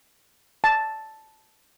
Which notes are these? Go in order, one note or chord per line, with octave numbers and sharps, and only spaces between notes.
A5